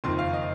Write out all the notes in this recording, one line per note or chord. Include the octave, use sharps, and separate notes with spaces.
F#1 F2 D#3 C6
F5
D#5